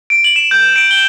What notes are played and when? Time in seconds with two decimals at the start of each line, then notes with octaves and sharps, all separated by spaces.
0.10 D7
0.24 F#7
0.36 E7
0.51 G6
0.76 D7
0.91 G7